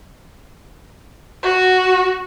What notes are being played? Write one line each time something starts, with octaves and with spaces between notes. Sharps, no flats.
F#4